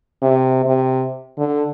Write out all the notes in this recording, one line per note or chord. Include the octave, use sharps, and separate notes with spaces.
C3
C3
D3